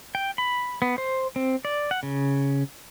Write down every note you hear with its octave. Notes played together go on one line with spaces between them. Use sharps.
G5
B5
B3
C5
C4
D5
F#5
C#3